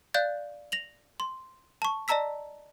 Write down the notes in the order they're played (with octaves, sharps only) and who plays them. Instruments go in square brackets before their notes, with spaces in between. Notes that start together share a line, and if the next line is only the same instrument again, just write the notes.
[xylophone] D5 F5 F#6 G6 A6
A#6 F7 F#7
C6
A5 C#6
D5 D#5 A5 A#5 E6 B6